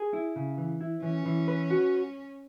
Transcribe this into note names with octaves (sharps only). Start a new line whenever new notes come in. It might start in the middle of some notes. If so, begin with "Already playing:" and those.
Already playing: G#4
E4
C#3
E3
E4
E3 C#4
E3
B4
F#4